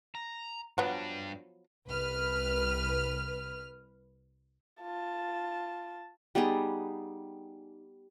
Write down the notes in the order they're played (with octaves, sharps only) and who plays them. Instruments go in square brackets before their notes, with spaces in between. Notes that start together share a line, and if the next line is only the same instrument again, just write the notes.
[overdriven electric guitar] A#5
[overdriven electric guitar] G2 D4 [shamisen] F3 F#3 B3
[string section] C2 B4 F6
[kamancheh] F4 A5
[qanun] G3 B3 D#4 G#4